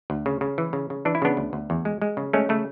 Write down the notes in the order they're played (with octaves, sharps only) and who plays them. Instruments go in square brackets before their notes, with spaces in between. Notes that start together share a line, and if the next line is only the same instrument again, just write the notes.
[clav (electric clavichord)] D2
C#3
C#3
E3
C#3
C#3
E3 D4
E4
C#3 B3 D4
D2
D2
E2
G#3
G#3
C#3
G#3 A3 C#4
C#3 A3